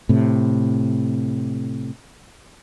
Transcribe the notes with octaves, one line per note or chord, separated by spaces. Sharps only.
A2 C3